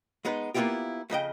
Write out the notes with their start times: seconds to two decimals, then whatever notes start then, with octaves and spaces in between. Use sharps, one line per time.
0.25 G#3 B3 D#4 B4
0.54 A#3 B3 C#4 E4 F4 G4
1.10 F2 C#3 D#5 G5